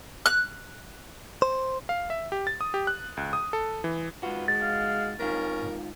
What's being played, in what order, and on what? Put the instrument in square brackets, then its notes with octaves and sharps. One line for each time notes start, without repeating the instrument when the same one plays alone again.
[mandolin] F#6
[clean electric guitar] C5
[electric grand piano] F5
E5
G4
A6
D#6
G4
F#6
C#2
D#6
A4
E3
[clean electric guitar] G#2 F#4 [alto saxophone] F4 [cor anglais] B4
[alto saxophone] G#3 [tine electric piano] A6
[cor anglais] F5
[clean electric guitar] G#2 D#3 F4 [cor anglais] C#4 [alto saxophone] A#4